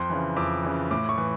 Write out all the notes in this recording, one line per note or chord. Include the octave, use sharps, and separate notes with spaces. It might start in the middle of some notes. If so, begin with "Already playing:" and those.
Already playing: F2 C6
C#3 E3
F2 D6
C#3 E3
A2 D6
C#6
E3